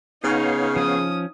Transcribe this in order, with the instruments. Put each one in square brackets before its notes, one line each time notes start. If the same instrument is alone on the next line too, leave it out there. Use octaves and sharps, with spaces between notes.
[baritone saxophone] C#3 [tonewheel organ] B3 C#5 F5 [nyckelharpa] D#4
[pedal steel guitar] F3 C#4 [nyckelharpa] D#6